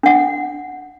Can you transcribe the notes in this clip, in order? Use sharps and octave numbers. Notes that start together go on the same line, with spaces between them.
D4 F#5